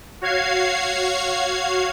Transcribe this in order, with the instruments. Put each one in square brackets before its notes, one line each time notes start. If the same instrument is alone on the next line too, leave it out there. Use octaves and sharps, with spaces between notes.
[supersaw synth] F#4 C#5 F5 G#6 C7